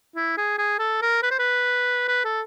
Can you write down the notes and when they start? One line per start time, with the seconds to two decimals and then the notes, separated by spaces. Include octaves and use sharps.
0.16 E4
0.38 G#4
0.58 G#4
0.79 A4
1.02 A#4
1.23 B4
1.31 C5
1.39 B4
2.08 B4
2.25 A4